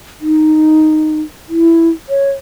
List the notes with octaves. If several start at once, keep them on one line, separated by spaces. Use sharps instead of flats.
D#4
E4
C#5